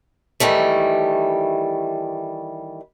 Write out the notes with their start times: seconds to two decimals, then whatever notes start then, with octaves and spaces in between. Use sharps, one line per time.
0.40 D#3 E3 G3 A3